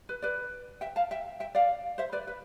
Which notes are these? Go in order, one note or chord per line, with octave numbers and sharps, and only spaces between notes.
B4
B4 D5
E5 G5
F5 A5
E5 G5
E5 G5
D5 F5
C5 E5
B4 D5
B4